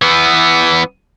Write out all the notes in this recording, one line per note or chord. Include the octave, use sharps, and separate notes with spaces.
E3 B3